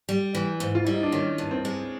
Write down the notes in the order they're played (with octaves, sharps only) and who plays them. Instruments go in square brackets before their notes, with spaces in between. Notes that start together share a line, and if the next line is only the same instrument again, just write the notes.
[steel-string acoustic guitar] G3
E3
G#2
[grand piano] F4
[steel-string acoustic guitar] G3 [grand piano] E4
[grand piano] D#4
D4
[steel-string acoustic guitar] D#3 [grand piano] C#4
[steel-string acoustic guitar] G2
[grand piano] C4
[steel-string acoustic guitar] G#3